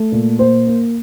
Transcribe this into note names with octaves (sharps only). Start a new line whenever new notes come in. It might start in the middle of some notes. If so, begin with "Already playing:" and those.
Already playing: A3
A#2
A#3 C5
A#3